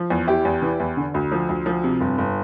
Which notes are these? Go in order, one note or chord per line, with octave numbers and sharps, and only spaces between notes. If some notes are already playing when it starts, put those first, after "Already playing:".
Already playing: F3
E2
E2 E4 G4
E2
E3
E2
D3
D2
F3
D2
F3
C3
G1
G1